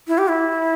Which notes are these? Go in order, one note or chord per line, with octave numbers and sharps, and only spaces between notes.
E4
G4
E4